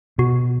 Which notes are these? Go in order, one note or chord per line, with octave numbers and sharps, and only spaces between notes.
B2 F#4